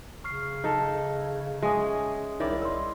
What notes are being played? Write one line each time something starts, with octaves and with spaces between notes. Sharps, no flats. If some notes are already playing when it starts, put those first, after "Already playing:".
C#3 C#6 F6 C7
D#4 A4
G#3 C#4 E5 G#5 D#6
C2 D#3 E4 C#5 D5
C6 E6